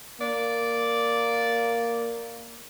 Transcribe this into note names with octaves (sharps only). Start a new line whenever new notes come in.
A#3 D5